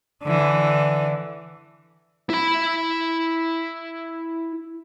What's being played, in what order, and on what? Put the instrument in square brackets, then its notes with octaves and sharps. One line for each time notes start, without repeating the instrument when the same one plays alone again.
[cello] D3 E3
[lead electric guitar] E4 B5